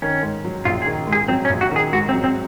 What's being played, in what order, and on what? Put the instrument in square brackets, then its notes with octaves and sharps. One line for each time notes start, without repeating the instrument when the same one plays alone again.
[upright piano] D#3 [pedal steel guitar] C#4
[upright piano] G#2
F#3
[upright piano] A#1 [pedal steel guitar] F4
[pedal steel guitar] G#4
[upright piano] D#3
G#2
[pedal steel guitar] G#4
[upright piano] F#3 [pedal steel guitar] C4
[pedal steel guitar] C#4
[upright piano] A#1
[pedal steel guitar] F#4
[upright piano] D#3 [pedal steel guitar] G#4
[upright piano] G#2 [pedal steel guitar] F#4
[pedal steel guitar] C4
[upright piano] F#3
[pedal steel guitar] C4